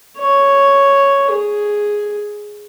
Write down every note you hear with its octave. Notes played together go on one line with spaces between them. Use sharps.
C#5
G#4